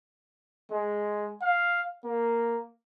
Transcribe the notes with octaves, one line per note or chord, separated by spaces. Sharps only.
G#3
F5
A#3